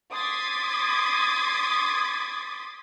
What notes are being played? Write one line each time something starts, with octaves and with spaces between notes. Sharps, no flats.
C6 D6 D#6 G#6 A6 B6